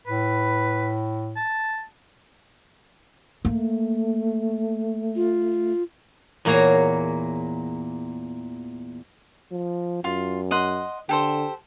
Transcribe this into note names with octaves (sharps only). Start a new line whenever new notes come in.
A2 B4
A5
A3 A#3
F4
E2 A#2 A#3 C#5 A#5
F3
F#2 F4
D#5 F#5 C6
D3 G4 A4 C5